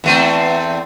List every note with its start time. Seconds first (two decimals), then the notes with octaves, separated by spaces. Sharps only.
0.04 E2 A3 C4